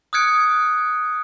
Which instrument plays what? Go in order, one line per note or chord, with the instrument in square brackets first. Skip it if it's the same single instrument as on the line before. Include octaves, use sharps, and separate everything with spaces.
[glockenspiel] D#6 F6 F#6 G#6 C#7 D7